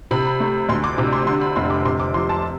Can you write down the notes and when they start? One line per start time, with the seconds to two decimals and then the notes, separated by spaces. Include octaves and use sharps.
0.11 C3 B5
0.40 A3
0.69 D2 C6
0.84 D6
0.98 C3 D6
1.13 C6
1.27 D3 C6
1.41 B5
1.56 F1 C6
1.70 D6
1.85 C3 C6
2.00 D6
2.14 F3 C6
2.29 A5